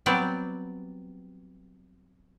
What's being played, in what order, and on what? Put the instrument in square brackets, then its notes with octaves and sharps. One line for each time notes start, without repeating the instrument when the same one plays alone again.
[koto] F#3 G3 B3 C4 D5 G5